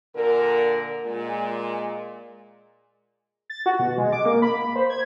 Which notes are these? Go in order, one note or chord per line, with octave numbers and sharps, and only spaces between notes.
A#2 D3 A#4
A#2 G#3
A6
F#4
B2
G#3
D6
A#3
B5
B5
C5
G#6